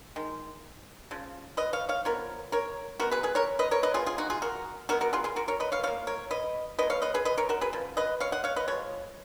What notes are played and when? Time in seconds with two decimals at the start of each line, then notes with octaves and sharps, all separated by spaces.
0.16 D#3 G#3
1.11 C#3 F3
1.57 B4 D#5
1.73 C#5 F5
1.89 C#5 F5
2.05 F3 B3 A#4 C#5
2.52 A#4 C#5
3.00 B2 G#3 B3 F#4 A#4
3.11 G#4 B4
3.23 G#4 B4
3.35 A#4 C#5
3.59 B4 D#5
3.71 A#4 C#5
3.83 B4 D#5
3.94 F3 B3 F4 G#4
4.06 F4 G#4
4.18 D#4 F#4
4.30 F4 G#4
4.42 F#4 A#4
4.89 B2 F#3 B3 F#4 A#4
5.01 F#4 A#4
5.13 F4 G#4
5.24 F4 G#4
5.36 F#4 A#4
5.48 A#4 C#5
5.60 B4 D#5
5.72 C#5 F5
5.83 F3 A#3 C#5 F5
6.07 A#4 C#5
6.31 B4 D#5
6.79 F3 B4 D#5
6.83 A#3
6.90 C#5 F5
7.02 B4 D#5
7.14 G#4 B4
7.25 B4 D#5
7.38 A#4 C#5
7.49 F#4 A#4
7.61 G#4 B4
7.73 C#3 F3
7.97 B4 D#5
8.20 C#5 F5
8.32 D#5 F#5
8.44 C#5 F5
8.56 B4 D#5
8.68 F3 G#3 C#5